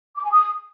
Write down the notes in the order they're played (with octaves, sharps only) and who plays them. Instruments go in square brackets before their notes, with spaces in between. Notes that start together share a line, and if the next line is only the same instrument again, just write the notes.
[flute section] D6
G#5
D#6